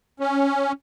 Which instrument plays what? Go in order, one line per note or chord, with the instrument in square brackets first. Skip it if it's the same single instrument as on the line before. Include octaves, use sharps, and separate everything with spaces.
[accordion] C#4